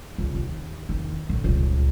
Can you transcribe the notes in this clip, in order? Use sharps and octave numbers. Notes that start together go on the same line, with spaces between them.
C#2
D#2
E2 D#3
A2 D3
D#1 C#2